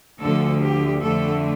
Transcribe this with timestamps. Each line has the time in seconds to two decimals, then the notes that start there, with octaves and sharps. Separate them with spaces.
0.21 D2 D3 F3 A3 A4
0.62 G4
1.02 F2 D3 A3 A4